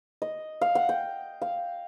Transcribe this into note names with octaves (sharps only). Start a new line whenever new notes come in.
D#5
F5
F#5
G5
F5